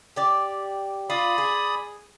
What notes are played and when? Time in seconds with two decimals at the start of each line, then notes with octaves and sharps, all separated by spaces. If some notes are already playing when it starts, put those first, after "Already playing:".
0.16 G4 D5
1.10 F4 D5 B5 D#6
1.38 G#4